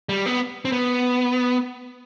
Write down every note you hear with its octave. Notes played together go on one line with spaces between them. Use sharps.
G3
B3
C4
B3